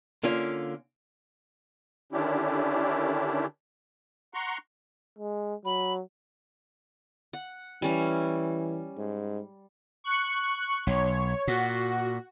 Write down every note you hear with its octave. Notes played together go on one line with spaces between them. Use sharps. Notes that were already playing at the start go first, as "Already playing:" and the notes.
D3 A#3 C#4 F4
D3 D#3 C#4 D4 E4 G4
F#5 A#5 C6 C#6
G#3
F#3 B5
F#5
E3 G3 C#4
G#2
C#6 F#6 C#7
B1 C#5
A#2 F#4